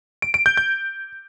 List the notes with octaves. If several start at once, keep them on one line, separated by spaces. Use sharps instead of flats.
D7
D7
G6
G6